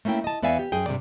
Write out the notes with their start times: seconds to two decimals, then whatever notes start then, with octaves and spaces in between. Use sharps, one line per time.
0.05 A3 A#3 C#4 E4 G5
0.24 D#5 A5
0.42 E2 B3 D5 E5 F5 G#5
0.59 G4
0.72 F#2 G#4 G5
0.86 G2 C3 D#3 A#3 D5